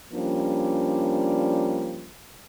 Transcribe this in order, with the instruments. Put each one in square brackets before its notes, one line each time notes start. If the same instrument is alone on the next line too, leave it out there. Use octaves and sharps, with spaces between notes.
[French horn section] F3 G3 A#3 C#4 D4